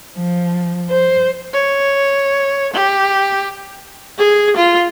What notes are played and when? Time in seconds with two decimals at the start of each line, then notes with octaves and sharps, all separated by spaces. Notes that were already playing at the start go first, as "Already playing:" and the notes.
0.17 F3
0.90 C5
1.53 C#5
2.73 G4
4.18 G#4
4.56 F4